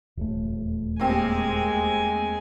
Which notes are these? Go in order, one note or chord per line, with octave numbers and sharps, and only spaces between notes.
D#1 E2 A3
G#3 A#3 C4 G4 G#5